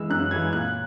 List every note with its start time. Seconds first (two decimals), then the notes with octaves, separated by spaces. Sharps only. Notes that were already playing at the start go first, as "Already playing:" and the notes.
Already playing: E3 G#3 E6
0.10 F#2 F#6
0.31 E3 G#3 G#6
0.53 A#2 F#6